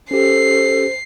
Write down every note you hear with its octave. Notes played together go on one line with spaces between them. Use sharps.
C#4 G4 A4 C5 C7